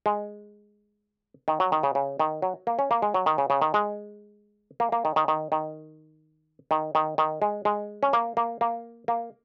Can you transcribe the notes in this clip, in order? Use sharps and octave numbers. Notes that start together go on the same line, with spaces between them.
G#3
D#3
F#3
D#3
C#3
C#3
D#3
F#3
A#3
C#4
A#3
G#3
F#3
D#3
C#3
C#3
D#3
G#3
A#3
A#3
D#3
D#3
D#3
D#3
D#3
D#3
D#3
G#3
G#3
C#4
A#3
A#3
A#3
A#3